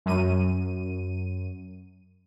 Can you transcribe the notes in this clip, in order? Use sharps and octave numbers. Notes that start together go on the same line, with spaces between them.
F#2 D#7